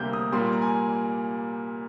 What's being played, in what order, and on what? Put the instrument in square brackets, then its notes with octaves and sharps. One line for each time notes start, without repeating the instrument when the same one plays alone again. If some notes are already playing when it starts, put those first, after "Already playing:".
Already playing: [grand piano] D2 C3 G3 A#3 G6
D#6
A#2 G3 A#3 C6
A#5
G#5